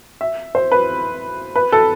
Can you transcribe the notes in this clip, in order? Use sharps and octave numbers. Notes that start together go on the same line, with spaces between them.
E5
C5
B4
B4
A4